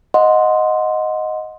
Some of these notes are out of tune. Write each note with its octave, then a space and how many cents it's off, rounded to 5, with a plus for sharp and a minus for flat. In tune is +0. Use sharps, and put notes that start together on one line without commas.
D#5 +5 F#5 -20 C6 -5